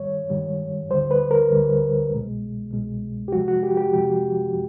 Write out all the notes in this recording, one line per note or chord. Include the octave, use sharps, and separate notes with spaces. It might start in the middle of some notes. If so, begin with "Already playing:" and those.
Already playing: G#2 D#3 G3 C#5
G#2 D#3 G3
D2 D3 G3 C5
B4
A#4
D2 D3 G3
C2 B2 G#3
C2 B2 G#3
G4
F2 C3 F3 G#3 F#4
F#4
G4
G4
F2 C3 F3 G#3 G4